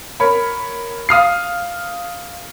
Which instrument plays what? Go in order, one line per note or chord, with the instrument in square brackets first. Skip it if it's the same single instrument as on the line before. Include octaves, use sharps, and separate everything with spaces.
[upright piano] A#4 C#5 B5
F5 D#6 F6 C7